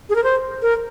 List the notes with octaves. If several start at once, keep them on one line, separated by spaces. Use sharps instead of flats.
G#4
A#4
C5
A#4